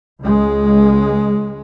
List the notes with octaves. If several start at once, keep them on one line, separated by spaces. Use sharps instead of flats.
C#2 G#3